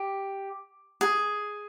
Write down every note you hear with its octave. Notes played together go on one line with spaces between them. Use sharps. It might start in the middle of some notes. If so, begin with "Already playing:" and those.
Already playing: G4
G#4